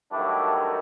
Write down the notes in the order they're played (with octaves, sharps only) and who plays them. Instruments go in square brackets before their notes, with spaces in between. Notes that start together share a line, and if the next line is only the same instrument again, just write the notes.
[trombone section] G2 D#3 F#3 A3 D4 E4